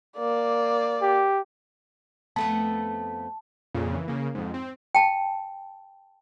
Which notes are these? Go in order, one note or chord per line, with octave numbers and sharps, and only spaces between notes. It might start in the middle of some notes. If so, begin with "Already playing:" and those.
A#3 D5
G4
F2 A3 B3 A5
F2 A#2 C#3
E3
C#3 A#3
F2 G#2
C4
G5 A5